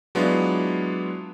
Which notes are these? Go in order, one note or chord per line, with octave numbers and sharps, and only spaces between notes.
F#3 G#3 B3 D4 E4 F4